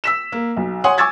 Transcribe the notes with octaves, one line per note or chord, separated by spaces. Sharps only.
E6 B6 E7
A#3
B1
C#5 F#5 G#5 C6 D#6
G#5 C#6 D6 E6 G#6 A6